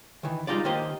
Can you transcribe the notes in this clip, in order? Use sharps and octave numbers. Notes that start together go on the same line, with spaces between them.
D#3 E3
G3 G#3 D#4 F4 D5
D#3 A#3 G4 C5 D#5